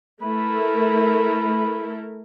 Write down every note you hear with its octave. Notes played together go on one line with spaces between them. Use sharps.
A3 E4 A#4 B4